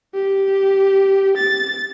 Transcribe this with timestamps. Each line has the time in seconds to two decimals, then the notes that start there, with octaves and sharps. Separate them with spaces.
0.14 G4
1.37 A6